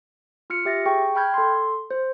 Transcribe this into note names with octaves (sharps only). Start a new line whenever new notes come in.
F4 F6 C#7
G4 E5 A6 A#6
G#4 G5 C#6
G5 B5 F6 G6 G#6
A4 C6
C5